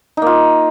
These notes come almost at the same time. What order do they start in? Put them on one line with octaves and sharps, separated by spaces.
D#4 A#3 F4